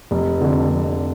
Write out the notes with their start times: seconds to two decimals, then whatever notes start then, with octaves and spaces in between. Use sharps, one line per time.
0.11 F1
0.41 F2 D3
0.69 F1